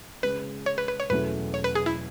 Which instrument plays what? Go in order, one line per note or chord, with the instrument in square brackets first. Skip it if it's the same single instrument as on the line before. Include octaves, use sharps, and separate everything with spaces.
[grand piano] C#3 G#3 C#4 [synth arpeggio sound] B4
[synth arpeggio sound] C#5
B4
B4
C#5
[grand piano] E2 B2 F#3 A3 C#4 [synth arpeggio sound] B4
[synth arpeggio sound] C#5
B4
G#4
E4